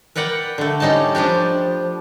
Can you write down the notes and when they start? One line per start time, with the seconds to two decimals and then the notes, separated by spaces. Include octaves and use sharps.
0.15 A#4 B4 D5 F#5 G5
0.58 D3 A3
0.80 G3 C#4 D#4 D#5 A5
1.15 F3 G3 D4 G4